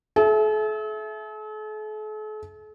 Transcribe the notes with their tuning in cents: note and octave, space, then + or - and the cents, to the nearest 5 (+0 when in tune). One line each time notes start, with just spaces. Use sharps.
A4 -45 E5 +0